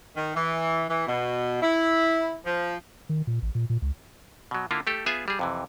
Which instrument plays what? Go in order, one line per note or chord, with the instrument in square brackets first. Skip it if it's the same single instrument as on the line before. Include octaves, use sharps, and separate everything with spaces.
[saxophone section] D#3
E3
E3
B2
E4
F3
[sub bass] D#3
A#2
A1
A#2
A#2
C#2
[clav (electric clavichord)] B2 F#3
D3 A#3 E4 F4
A3 G4 A4
B3 F4 G#4 E5 G#5
G3 G#4
F2 C3 E3